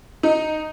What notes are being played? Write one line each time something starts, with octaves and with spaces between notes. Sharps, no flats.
D#4